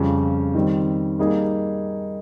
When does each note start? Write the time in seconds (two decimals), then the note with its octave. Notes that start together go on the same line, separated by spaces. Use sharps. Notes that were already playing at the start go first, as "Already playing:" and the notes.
Already playing: F2 C#3 G3 C4 G4
0.55 D#3 G3 C4
1.19 G3 A#3 D#4 G#4